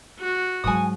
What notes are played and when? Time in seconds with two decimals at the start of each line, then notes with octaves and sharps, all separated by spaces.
0.19 F#4
0.64 G#2 F#3 G#5 D#6